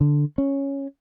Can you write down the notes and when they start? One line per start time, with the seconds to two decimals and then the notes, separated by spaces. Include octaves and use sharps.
0.01 D3
0.38 C#4